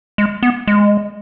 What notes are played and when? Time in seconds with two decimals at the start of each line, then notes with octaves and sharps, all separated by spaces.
0.18 G#3
0.43 B3
0.67 G#3